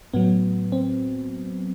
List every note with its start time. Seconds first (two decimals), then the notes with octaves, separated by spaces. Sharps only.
0.14 A2 F#3 B3
0.72 C4